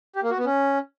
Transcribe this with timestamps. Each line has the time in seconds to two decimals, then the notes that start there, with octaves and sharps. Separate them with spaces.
0.16 G4
0.23 A#3
0.31 F#4
0.38 B3
0.45 C#4